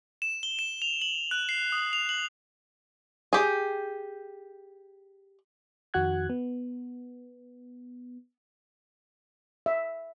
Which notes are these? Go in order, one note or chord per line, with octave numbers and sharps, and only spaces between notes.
E7
G7
E7
F7
F#7
F#6
C7
D#6
F7
F#7
G4 G#4
F2 D#3 F#4 F#5 F#6 G#6
B3
E5